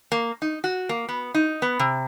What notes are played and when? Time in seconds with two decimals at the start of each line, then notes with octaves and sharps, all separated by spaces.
0.12 A#3
0.42 D#4
0.64 F#4
0.89 A#3
1.09 B3
1.34 D#4
1.62 B3
1.79 C3